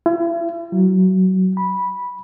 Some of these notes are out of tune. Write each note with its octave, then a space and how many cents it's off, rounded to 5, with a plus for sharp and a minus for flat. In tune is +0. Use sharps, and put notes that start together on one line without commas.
E4 +40
F#3 +20
B5 -10